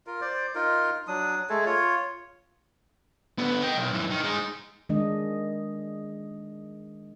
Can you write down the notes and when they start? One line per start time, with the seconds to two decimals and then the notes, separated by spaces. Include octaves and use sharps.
0.07 F4 A#4
0.21 C5 D5
0.55 D#4 F4 A#4
1.07 F#3 D4 D#6
1.49 G#3 A3 G#4 A4
1.66 F4 C#5
3.38 D3 B3
3.63 D#5 G5
3.77 B1
3.93 F#2 E3
4.11 D#3
4.24 G#3 D#4
4.89 D#3 G#3 D4 D#5